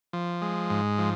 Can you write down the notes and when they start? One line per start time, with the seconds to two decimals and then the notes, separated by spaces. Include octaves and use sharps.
0.13 F3
0.42 G#3
0.70 G#2
0.98 F3